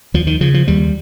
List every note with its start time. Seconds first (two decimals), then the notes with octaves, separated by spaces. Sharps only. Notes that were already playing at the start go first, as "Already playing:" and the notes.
0.14 D#2 F3
0.27 D#3
0.41 C#3 F3
0.54 F3
0.68 D#2 G3